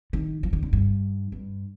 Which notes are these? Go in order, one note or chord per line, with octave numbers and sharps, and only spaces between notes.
D#3
F3
D#3
D3
G2
G2